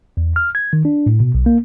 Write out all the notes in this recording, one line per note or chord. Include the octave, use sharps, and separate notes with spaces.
E2
F6
G#6
D#3
D4
A2
B2
B1
A#3